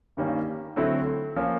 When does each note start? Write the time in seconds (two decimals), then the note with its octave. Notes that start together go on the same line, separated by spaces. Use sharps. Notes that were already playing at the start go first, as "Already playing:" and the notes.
0.17 G2 D#3 G3 A#3 C#4
0.76 D3 F#3 A3 C4 E4
1.36 F3 A#3 C#4